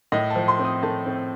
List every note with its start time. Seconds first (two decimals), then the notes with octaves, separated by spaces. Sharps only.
0.12 A2 D#5
0.30 A5
0.36 F3
0.48 C6
0.59 C4
0.65 D#6
0.83 A3 A5
1.06 C4